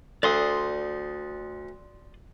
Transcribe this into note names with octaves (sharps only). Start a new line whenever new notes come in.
D2 D5 C6 D#6